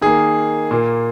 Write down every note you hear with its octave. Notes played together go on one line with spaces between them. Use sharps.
D#3 A#3 G#4
A#2 A#3